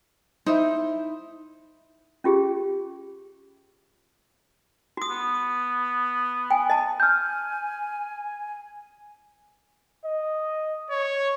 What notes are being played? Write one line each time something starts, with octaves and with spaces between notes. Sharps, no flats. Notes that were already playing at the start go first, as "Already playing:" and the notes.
D#4 E4 C5
C#4 F4 G4 G#4
F#4 D#6
B3
G5 G#5
D#5 A5
G#5 F6 G6
D#5
C#5